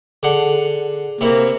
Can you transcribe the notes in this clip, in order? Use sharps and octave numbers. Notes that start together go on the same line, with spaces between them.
D3 G#4 F#5 C6
C3 A#3 C4 E4